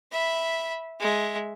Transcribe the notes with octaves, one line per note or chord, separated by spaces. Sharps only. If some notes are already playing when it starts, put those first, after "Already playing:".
E5 B5
G#3 E5